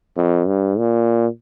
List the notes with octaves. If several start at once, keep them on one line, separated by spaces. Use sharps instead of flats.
F2
G2
A#2